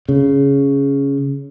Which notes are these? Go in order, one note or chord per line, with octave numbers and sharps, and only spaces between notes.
C#3